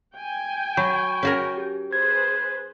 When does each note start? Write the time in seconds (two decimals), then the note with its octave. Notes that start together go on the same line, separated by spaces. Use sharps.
0.16 G5 G#5
0.77 F#3 B5 C#6 G6
1.23 C#4 F#4 A#4
1.57 G4
1.93 G#4 B4 C5 G#6